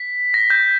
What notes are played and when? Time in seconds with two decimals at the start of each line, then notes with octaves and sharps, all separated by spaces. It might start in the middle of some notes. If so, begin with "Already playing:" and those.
Already playing: B6
0.34 A#6
0.50 G6